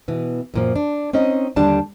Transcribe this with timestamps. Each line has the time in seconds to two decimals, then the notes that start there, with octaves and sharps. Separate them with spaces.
0.08 B2 E3
0.54 F#2 A#2 F3
0.76 D4
1.13 C4 C#4 D#4 D#5
1.56 D#2 D3 G3 D4 D5 A5